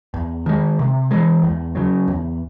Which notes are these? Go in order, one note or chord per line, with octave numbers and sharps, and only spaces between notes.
E2
D#3 G#3
C3
E3 G#3
E2
C#3 F#3
E2